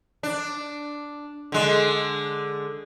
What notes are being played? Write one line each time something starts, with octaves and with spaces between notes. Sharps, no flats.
D4
D3 G#3